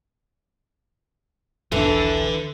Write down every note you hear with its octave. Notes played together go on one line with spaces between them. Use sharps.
D#1 A#1 D3 E3 D4 A4